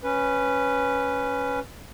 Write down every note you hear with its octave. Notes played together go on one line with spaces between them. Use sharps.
C#4 B4